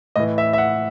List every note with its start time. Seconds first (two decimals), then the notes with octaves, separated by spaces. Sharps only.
0.16 A2 E3 D#5
0.38 E5
0.53 E5
0.58 F#5